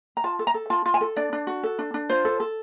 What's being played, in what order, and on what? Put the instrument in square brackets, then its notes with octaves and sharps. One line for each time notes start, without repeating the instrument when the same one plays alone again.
[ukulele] A#5
F4 A5
A4
A#5
A4
F4 A5
F4
G#5
A4
D4 D5
D4
F#4
A4
D4
D4
F4 C5
A4
A4